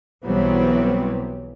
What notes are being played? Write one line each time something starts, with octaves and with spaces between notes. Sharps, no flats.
B1 E3 F#3 G3 B3 C4